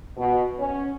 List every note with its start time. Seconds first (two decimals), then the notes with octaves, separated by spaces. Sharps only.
0.17 B2
0.59 C#4